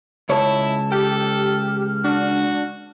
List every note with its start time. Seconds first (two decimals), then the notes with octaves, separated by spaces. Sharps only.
0.29 C#2 E4 C#5 A5
0.92 G4 A4 F6
2.04 D4 F#4